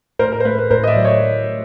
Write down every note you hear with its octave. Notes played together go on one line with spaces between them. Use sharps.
A2 A#4 C5
A#4
C5
A3 B4
B4
A2 A#4 C5
D#5
D5 E5
F#3
C#5 D#5